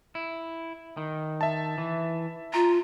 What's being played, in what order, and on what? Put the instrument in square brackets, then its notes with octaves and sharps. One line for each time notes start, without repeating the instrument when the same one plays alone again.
[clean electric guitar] E4
D#3
[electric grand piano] E5 A5
[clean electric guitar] E3
[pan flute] F4 [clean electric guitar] A#5